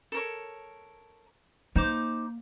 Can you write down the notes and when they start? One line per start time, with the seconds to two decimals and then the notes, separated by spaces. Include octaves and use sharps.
0.12 A4 A#4 C#5
1.76 A#3 D#4 C5 D6